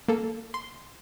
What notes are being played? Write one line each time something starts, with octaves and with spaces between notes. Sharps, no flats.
A#3 A4
C6